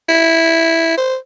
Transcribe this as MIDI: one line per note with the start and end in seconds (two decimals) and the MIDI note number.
0.09 0.94 64
0.97 1.16 72